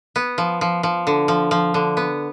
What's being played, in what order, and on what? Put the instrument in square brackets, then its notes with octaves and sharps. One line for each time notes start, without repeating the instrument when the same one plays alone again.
[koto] B3
F3
F3
F3
D3
F3
F3
D3
B3